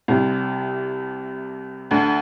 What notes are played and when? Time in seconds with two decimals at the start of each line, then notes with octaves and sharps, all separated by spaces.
0.08 C2 C3
1.91 D2 D3